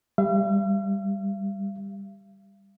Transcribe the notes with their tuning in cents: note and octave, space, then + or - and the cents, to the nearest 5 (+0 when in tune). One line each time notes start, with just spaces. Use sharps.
G3 +15 F5 -45